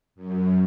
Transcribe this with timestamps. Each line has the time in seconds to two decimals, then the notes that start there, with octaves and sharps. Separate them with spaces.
0.15 F#2